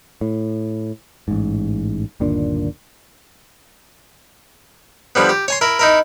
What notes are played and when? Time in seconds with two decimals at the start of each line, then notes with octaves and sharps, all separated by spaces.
0.21 A2
1.28 A1 G#2
2.20 G1 D#2 A#2 D4
5.15 D3 F3 G3 B3
5.29 G4
5.48 C#5 G#5 C6
5.61 E4 A#4
5.79 D#4 E4 A#4